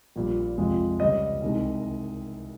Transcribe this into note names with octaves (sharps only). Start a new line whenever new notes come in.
A#1 A#2 G3
F2 C3 F3 G#3
C#2 C#3 G3 D#5
C2 C3 D#3 G#3